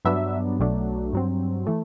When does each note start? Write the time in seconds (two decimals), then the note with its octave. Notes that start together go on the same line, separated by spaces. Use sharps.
0.05 G2 F#3 B3 D4 E5
0.59 B1 B2 F#3 A3 D4
1.13 G2 F#3 C4
1.67 E3 A3